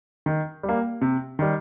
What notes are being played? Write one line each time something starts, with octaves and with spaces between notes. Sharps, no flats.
D#3
G3
A#3
C3
D#3 G3